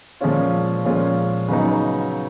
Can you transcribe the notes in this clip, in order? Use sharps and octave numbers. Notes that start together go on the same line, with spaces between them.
A#2 F3 G#3 C#4 F4
A#2 F3 G#3 C#4 F4
C#3 F#3 B3 D#4